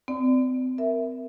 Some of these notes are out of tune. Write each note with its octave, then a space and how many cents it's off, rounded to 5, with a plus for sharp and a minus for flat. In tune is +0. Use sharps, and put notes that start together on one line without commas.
C4 -30 D5 +0
A#4 +0 E5 +5